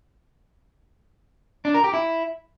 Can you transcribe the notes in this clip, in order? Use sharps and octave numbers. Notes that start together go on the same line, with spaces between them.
D4
A#4
G4
E4